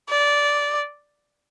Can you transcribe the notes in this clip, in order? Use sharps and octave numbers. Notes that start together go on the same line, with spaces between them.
D5